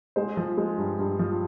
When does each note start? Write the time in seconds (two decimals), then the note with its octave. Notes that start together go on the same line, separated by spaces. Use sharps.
0.16 G#3 C5
0.37 F3
0.57 G#3
0.78 G2
0.99 G2
1.19 F3